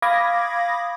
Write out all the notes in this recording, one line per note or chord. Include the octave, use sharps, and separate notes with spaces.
F5 B5 D6 D#6 G#6 A#6